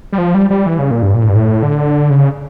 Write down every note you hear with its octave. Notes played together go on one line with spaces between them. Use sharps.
G3
F3
G3
G3
E3
C#3
A#2
G2
A#2
A2
G2
A2
D3
C#3